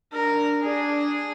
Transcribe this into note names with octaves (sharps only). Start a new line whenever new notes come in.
D4 A#4
D4 G#4